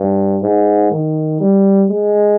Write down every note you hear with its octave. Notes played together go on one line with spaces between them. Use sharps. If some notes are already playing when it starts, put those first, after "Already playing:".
Already playing: G2
G#2
D#3
G3
G#3